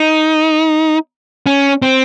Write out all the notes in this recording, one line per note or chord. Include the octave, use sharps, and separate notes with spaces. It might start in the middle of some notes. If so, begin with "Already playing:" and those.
Already playing: D#4
C#4
C4